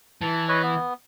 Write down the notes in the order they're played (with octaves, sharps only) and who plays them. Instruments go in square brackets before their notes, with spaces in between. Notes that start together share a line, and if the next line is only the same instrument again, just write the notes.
[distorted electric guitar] E3 [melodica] A5
[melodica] B4 C#5 D#5
B3